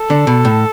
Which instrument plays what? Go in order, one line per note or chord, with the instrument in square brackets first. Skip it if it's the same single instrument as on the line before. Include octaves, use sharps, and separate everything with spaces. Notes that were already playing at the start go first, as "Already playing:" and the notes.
Already playing: [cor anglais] A4
[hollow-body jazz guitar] D3
B2
A2